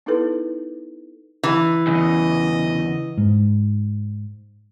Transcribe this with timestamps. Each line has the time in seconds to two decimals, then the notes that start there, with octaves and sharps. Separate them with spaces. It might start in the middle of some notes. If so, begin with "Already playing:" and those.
0.06 B3 D#4 E4 G#4 A4 B4
1.43 E3
1.87 E2 C#3 D#5
3.17 G#2